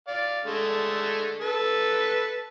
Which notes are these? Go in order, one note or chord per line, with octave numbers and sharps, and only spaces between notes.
D5 F5
D3 G#3 A3
A4 B4